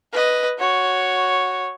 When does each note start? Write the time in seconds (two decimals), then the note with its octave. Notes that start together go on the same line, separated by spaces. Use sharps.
0.12 B4 D#5
0.59 F#4 C#5